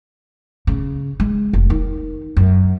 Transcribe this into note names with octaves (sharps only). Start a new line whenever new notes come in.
C#3
G#3
F1
D#3
F#2